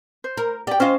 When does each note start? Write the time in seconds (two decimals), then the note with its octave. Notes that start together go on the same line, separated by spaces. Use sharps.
0.24 C5
0.37 A#4
0.67 G4 D5 G5
0.80 C#4 F4 C5 D#5 F5